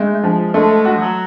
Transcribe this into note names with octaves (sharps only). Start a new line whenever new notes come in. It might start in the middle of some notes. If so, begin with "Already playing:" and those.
Already playing: G#3 A3
F3
G#3 A3
F#4
F3
F#3